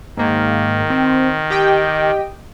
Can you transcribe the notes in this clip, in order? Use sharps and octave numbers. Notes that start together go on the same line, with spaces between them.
G#2 D#3 A#3
C4
G4 D#5 G5